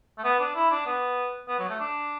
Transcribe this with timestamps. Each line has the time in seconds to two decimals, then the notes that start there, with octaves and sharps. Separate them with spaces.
0.18 A3
0.24 B3
0.39 D4
0.55 E4
0.71 D4
0.86 B3
1.48 B3
1.59 F#3
1.69 A3
1.80 D4